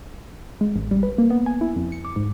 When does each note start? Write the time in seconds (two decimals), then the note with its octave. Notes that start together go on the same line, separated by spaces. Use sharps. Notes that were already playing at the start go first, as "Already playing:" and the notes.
0.61 G#3
0.76 A1
0.91 G3
1.03 B4
1.18 A#3
1.30 B3
1.46 G#5
1.61 E4
1.76 F2
1.92 C#7
2.05 D6
2.16 G#2